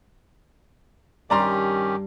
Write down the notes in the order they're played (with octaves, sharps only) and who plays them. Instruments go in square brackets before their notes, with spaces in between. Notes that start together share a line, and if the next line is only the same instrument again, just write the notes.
[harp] G2 [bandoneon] D#3 C#4 G4 [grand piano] D5 A#5 C6